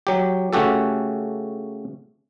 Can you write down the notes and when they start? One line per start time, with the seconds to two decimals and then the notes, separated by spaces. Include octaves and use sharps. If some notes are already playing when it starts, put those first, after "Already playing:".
0.07 F#3 G4
0.53 C#3 A3 C#4 F#4 G4 A4